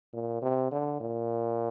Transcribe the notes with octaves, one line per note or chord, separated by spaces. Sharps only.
A#2
C3
D3
A#2